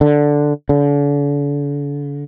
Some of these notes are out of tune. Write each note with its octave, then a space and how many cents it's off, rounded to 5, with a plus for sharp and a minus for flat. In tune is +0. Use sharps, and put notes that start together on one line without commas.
D3 +0
D3 -40